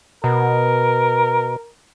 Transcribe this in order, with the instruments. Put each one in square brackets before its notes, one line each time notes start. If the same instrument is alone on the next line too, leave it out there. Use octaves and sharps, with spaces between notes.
[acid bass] B2 [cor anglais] A#4